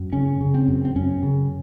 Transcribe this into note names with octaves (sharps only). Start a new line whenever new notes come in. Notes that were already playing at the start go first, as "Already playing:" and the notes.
Already playing: F#2
C#3 C#4
C#3
C4
F#2
C4
F#2 C#4
C#3